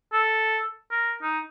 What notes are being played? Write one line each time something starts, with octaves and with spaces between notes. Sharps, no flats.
A4
A#4
D#4